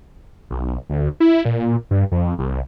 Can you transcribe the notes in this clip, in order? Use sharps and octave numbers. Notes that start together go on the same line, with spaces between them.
B1
D2
E4
A#2
G2
F2
C2